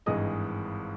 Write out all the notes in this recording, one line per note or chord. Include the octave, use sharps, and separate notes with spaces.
G#1 G2 E3 G#3 D#5 D#6